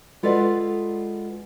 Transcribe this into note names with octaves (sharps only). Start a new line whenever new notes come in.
G#3 F4 A4 B4 D5 F#5